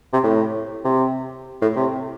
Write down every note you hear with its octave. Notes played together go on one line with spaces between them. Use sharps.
C3
A2
C3
A2
C3